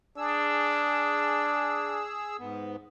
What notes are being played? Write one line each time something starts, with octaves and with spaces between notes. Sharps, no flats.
D4 G#4 E6
G#2 B3